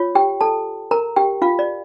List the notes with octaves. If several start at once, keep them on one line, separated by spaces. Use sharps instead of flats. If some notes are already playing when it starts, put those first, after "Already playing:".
Already playing: F4 C#5
G4 G5
A4 A5
A#4 A#5
G4 G5
F4 F5
D5